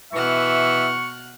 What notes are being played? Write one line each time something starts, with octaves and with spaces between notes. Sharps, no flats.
B2 E3 E5 F#5 C#6 F6